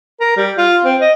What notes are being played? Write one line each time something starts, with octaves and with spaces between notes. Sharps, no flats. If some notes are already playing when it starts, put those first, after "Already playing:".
A#4
G3
F4
C4
D#5